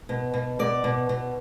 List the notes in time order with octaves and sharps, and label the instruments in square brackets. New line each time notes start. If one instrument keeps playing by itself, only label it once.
[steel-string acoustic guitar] B2
B2
B2 D5
B2
B2